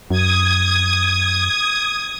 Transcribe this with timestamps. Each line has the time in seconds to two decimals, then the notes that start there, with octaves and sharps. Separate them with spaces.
0.11 F#2 D#6 G#6